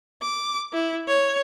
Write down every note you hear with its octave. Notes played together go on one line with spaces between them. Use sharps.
D6
E4
C#5